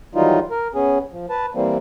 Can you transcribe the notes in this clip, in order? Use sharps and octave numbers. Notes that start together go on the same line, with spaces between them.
D#3 E3 F#3 G3 D#4 F4
A#4
B3 C#4 G#4
F3
B4 A5
E3 G3 A#3 C4